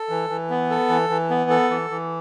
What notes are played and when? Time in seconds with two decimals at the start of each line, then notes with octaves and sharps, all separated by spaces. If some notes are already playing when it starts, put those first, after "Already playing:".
Already playing: A4
0.09 E3
0.30 E3
0.50 B3
0.70 A4
0.89 E3
1.10 E3
1.30 B3
1.50 A4
1.70 E3
1.90 E3